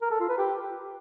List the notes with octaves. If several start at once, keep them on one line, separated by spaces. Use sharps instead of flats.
A#4
A4
F4
B4
G4